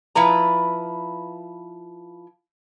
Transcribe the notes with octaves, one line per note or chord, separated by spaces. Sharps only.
F3 E4 B4 A#5